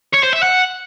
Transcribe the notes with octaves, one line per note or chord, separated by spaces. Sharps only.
C#5
C5
E5
F#5